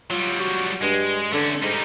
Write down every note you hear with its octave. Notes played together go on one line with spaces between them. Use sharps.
F#3 G3 F4
F#4
G2 G#3
D3 A3 C#4
G#2 G3 D#4